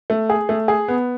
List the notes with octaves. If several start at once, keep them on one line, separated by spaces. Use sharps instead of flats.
A3
G#4
A3
G#4
B3